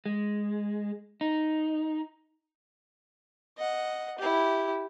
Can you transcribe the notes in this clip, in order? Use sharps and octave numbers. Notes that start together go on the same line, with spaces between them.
G#3
D#4
D#5 F#5
E4 G4